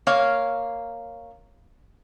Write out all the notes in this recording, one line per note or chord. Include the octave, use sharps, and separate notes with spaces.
A#3 C#5 F5